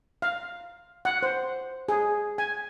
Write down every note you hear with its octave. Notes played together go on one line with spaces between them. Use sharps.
F5
F#5
C5
G#4
G#5